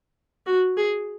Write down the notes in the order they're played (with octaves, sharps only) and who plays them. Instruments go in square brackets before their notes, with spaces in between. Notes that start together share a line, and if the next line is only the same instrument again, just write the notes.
[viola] F#4
G#4